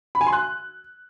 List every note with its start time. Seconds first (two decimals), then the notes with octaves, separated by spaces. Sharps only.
0.15 B5
0.21 G#5
0.27 C6
0.33 F#6